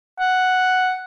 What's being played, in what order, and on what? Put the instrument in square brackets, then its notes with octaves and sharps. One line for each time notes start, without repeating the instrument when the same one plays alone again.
[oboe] F#5